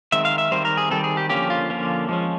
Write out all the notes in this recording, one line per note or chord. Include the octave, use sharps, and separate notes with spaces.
D#3 G#3 C4 E5
F5
E5
D#3 G3 C4 C5
A#4
G#4
D#3 G3 C4 A4
G#4
G4
D3 F3 A#3 C#4 G4
F4
D3 F3 A#3 C#4
F3 G#3 C#4